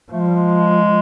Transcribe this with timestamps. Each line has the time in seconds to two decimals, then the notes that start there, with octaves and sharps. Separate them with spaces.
0.11 F3 A3
0.20 G#3
0.28 G3
0.36 G#3